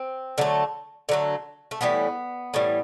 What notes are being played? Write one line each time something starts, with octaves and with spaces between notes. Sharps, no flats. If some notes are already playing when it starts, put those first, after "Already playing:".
Already playing: C4
D3 F#3 A3
D3 F#3 A3
A3
A2 E3 G3 B3
A2 E3 G3